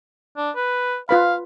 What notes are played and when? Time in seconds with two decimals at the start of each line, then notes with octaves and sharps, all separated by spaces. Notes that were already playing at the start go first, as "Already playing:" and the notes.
0.37 D4
0.56 B4
1.09 F4 B4 F5 B5